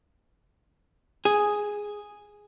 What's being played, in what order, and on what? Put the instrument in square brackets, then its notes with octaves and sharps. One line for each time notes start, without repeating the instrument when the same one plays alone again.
[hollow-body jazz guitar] G#4